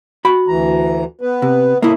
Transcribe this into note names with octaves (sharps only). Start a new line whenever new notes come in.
F#4 B5
D2 E3 A#5
B3 B4
C3
A2 A#3 E4 D#5 E5